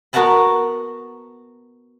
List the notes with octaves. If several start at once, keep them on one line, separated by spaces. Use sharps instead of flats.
B3 F#4 A#4 F#5 A5 B5